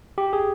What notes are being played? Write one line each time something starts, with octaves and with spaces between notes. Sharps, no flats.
G4
G#4